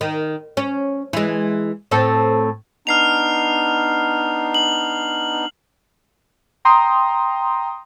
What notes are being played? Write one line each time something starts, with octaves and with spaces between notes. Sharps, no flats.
D#3
C#4
E3 G#3
A2 C4 A4
B3 D4 D#4 F6 C7 F7
F#7
G5 A#5 C6 D#6